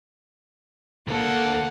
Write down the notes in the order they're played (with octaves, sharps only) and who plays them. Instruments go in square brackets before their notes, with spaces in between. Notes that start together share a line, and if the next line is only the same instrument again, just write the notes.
[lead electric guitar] D2 A4 [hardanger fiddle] A#3 F#5